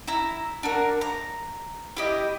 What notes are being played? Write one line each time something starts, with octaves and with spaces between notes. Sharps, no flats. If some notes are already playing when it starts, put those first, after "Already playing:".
E4 E5 A#5
D4 F#4 A#4
A#5
E4 G4 D#5